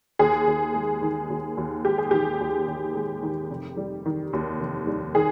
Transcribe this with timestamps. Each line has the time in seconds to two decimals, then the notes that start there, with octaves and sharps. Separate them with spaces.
0.19 D#2 G#4
0.47 D#2
0.74 G#3
1.02 D#3
1.30 D#2
1.57 D#2
1.85 G#3 G4
1.98 G#4
2.11 D#3 G4
2.40 D#2
2.68 D#2
2.95 G#3
3.23 D#3
3.51 F1
3.77 G3
4.06 D#3
4.33 D#2
4.60 F1
4.87 G3
5.15 D#3 G#4